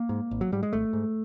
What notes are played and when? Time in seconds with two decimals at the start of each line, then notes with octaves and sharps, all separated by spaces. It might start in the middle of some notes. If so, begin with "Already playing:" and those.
Already playing: A#3
0.09 G#2
0.31 G#1
0.41 F#3
0.52 G#2 G3
0.63 G#3
0.73 G#1 A3
0.93 G#2